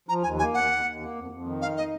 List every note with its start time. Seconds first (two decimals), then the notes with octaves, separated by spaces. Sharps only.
0.08 F3 A#5
0.23 D#2 G#5
0.39 A#3 G#5
0.54 D#2 F#5
0.69 D#2
0.85 D#2
1.00 A#3
1.15 F2
1.31 F2
1.46 D#3
1.61 D#4 F5
1.77 D#5